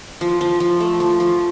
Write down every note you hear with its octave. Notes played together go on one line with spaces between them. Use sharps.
F3
F3
F3
A3
F3
F3